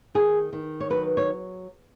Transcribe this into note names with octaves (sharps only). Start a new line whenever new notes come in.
D#3 G#4
D#3
C#5
F#3 B4
C#5